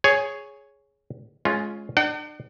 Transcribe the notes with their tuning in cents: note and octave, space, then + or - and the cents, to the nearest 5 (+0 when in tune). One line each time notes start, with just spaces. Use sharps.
G#4 +0 C#5 +0
G#3 +25 C#4 +0 F4 +0
D4 +40 F#5 +45